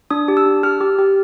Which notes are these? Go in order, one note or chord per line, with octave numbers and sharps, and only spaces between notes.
D4 D#6
G4
E6
D4
G4 F6
G4
G4